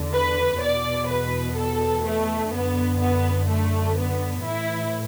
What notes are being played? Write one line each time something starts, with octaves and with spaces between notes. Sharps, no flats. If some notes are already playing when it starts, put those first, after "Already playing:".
Already playing: E2 D3
B4
E2 B2 D5
B4
A4
A3
F#2 D3 B3
B3
A3
B3
A2 E3 E4